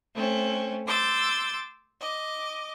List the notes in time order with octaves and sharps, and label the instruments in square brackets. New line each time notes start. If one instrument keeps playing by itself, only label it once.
[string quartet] A3 C4 C#4
C6 D6 E6 G6 A6
D#5 D6